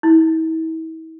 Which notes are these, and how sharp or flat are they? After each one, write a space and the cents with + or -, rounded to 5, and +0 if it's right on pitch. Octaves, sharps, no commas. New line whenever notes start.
E4 -40